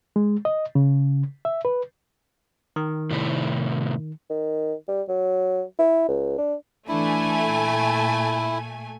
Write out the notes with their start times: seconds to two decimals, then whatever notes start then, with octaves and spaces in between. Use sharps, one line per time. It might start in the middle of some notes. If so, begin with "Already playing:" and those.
0.16 G#3
0.45 D#5
0.75 C#3
1.45 E5
1.65 B4
2.76 D#3
3.11 A2 C3 E4
4.30 D#3
4.88 G3
5.08 F#3
5.79 E4
6.08 C#2
6.38 D4
6.89 E3 A3 D4 E4 G#5
7.47 A#2